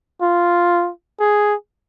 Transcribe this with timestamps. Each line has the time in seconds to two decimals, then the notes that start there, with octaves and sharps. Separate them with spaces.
0.21 F4
1.20 G#4